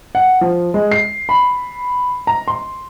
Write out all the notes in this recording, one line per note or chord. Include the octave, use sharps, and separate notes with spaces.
F#5
F3
G#3
C7
B5
A#5
C6